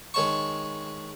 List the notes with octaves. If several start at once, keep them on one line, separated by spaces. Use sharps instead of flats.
D#3 G#3 C#5 A5 C#6